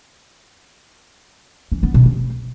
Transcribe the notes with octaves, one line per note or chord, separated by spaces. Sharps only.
E3
B3
B2
C4